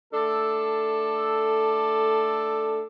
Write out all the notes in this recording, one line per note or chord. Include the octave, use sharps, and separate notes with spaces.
A3 D4 A4